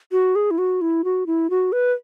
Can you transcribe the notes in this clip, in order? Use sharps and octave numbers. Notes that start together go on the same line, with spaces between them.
F#4
G#4
E4
F#4
E4
F#4
E4
F#4
B4